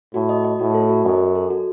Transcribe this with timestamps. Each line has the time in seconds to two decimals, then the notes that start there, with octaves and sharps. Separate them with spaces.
0.14 A2 F#4
0.29 D#5
0.44 D#5
0.59 A2 F#4
0.74 A4
0.90 F#4
1.05 F#2 D#5
1.20 D#5
1.35 A4
1.50 F#4